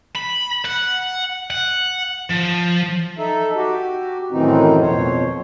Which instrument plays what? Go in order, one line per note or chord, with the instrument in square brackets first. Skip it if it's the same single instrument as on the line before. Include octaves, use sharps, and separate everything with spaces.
[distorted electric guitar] B5
F#5
F#5
F3
[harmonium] D#4 A4 E5
F#4 G4
F#2 A2 D#3 E3 C4 D#4
F2 B2 C5 C#5